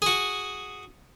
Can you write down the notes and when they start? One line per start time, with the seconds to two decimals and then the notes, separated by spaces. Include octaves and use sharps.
0.02 F#4 G#4